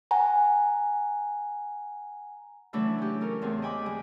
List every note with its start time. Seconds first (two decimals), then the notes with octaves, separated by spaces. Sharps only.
0.11 F#5 G#5 A#5
2.73 C#3 E3 F#3 A3 D4 B4
2.98 C#4 G4
3.21 C#4 A4 A#4
3.42 E2 A3 C4 G#4
3.62 D#5 G5 G#5 B5 D6
3.86 D3 G#3 G#4